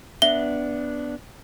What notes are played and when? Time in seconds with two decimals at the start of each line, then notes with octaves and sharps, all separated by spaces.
0.22 B3 D4 E5 G7